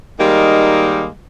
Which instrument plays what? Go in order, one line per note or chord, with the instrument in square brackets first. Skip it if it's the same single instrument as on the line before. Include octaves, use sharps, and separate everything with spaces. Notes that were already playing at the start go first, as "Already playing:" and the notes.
[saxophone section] D#3 G3 G#3 A#3 D#4